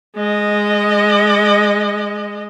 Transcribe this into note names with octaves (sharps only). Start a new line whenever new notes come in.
G#3 D#5